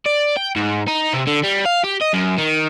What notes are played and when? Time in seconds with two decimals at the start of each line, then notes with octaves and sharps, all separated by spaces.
0.06 D5
0.37 G5
0.56 G#2
0.87 D#4
1.13 C3
1.27 D3
1.43 G3
1.65 F5
1.83 G4
2.01 D#5
2.13 F#2
2.38 D#3